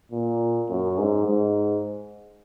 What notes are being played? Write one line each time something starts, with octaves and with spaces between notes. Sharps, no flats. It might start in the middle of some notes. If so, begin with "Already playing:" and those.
A#2
F#2
G#2
G#2